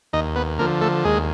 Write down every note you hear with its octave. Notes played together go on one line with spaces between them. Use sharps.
D#2 D#4 D#5
B3 B4
D3 F3 A#3 A#4
A3 A4
D#2 G#3 G#4